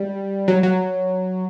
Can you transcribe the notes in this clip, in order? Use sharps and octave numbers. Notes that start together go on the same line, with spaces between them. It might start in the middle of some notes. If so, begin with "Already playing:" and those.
Already playing: G3
F#3
F#3